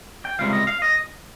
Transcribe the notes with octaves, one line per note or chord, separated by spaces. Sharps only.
G5
C#2 C3 G3 C4 F5
D#5
F5
D#5